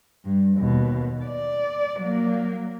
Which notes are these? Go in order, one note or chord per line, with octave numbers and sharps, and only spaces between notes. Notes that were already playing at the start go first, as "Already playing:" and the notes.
G2
D#2 B2
D5
F#3 A#3